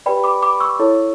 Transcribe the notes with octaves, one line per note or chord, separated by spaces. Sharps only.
G4 B4 D5 G5 B5
B5 D6
B5 D6
C#6 E6
E4 A4 C#5